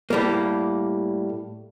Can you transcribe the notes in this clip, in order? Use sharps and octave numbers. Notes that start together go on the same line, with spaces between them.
A2 G3 A#3